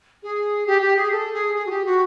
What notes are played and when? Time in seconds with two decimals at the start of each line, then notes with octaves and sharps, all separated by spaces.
0.23 G#4
0.67 G4
0.81 G4
0.96 G#4
1.11 A4
1.33 G#4
1.56 G#4
1.66 F#4
1.70 G4
1.85 F#4